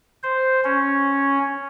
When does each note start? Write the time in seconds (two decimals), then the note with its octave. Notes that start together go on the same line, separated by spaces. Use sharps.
0.23 C5
0.64 C#4